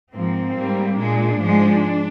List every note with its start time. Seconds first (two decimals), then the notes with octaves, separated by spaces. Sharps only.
0.13 G#2 F3 A#3 C4
0.55 G#2 G3 A#3
0.97 A#2 G#3 D4
1.39 G#2 F3 G#3